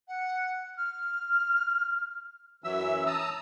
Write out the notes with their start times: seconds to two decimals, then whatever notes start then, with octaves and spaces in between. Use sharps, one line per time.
0.08 F#5
0.77 F6
2.64 F#2 E3 F#3 E5 E6
3.06 A5 A#5 D#6 E6